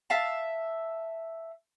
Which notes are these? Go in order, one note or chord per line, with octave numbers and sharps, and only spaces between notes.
E5 F5 A5